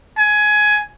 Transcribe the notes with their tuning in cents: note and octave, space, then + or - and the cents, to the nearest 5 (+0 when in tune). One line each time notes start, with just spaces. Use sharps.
G#5 +15